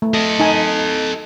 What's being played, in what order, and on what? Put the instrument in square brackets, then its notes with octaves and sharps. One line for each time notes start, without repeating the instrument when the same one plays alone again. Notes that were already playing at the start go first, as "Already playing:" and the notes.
[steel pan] A3
[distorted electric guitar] A4 D#5
[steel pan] D#4 G#5